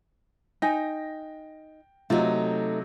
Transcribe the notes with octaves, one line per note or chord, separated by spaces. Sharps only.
D#4 G5 G#5 A#6
C3 F#3 A3 D#4 F4